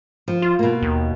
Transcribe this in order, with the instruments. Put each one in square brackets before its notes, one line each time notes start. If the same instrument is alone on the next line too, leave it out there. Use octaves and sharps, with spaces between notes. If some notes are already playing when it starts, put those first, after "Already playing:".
[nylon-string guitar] F3
[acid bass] F4
[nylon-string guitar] B2 A#3
[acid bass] D#2